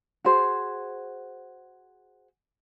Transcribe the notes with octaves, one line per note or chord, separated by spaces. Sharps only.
F#4 G#4 C5